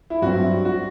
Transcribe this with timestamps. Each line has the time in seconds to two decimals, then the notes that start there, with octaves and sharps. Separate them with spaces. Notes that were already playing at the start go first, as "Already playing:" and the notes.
0.10 E4
0.22 G2 F#3 C4 F#4
0.65 F#4